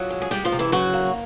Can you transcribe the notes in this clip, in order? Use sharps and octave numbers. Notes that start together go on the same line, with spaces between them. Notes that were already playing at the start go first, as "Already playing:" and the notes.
Already playing: F3 F#3 F#4
G#3
G#4
G3 G#3 G4
F3 F4
C3
E3 E4
C#3 F#3 F#4
A#3